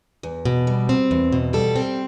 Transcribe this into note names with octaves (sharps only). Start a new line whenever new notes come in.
E2
B2
G3
C4
E2
B2
G3 A4
C4